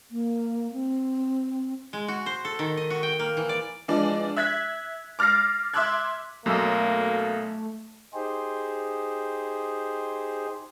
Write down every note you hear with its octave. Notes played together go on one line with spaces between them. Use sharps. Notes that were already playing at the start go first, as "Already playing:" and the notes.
A#3
C4
G#3
F#4
C5
A4
D#3
D#5
F#4
G5
A#3
E3
D5
E3 F3 G#3 D4 D5
E5 F#6 G#6 B6
D6 F6 A6 A#6 C7
E5 C6 D6 E6 F#6 G#6
B1 F#2 A3 A#3 E6
D#4 G4 G#4 C5